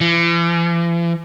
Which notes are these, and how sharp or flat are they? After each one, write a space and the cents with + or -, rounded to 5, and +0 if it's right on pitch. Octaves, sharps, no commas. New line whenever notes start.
E3 +45